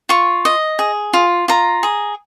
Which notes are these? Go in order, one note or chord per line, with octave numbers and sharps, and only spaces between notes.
F4 C#6
D#5
G#4
F4
F4 A#5
G#4